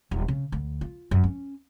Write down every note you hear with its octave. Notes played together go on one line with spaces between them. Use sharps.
D#1
C#3
D2
F4
F#2
C#4